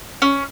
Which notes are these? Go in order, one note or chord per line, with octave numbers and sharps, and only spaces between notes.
C#4